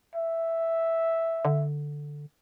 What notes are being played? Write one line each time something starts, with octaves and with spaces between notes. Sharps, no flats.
E5
D3